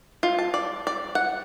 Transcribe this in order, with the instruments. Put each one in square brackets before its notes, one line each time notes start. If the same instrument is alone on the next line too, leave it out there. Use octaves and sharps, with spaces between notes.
[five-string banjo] F4
A5
D5
D5
F#5